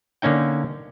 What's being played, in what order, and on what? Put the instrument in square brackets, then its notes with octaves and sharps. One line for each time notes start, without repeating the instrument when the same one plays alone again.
[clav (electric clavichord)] D3 A#3 C#4 D#4 G5